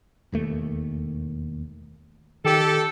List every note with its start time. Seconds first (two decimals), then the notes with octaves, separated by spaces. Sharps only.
0.32 E1 D#2 A3
2.44 D#3 G4 A4